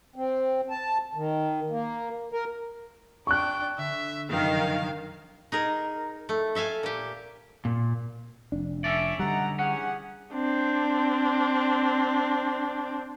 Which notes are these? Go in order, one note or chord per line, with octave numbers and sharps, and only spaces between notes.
C4
A5
D#3
A#3
A#4
D4 G5 C#6 F#6
D3 E5
F1 F#2 D#3 F#3 F5
D#4 G#4 A#4
A3
A4 E5 F5 G#5
A#2 G4
A#2
F1 D4
C#4 A4 D5 E5
B2 D3 G3 D#4 F#5 A#5
E3 C#4 G4 G#4 F#5
C4 D4